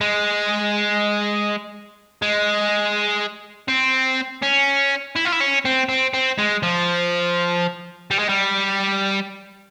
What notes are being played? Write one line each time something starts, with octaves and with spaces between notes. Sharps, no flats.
G#3
G#3
C4
C#4
E4
F4
E4
C#4
C4
C4
C4
G#3
F3
G3
G#3
G3